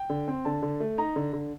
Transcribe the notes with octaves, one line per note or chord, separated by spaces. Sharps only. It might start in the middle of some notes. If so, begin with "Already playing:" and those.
Already playing: G5
D3
C4
D3 A5
D3
A3
D#4 A#5
D3
D3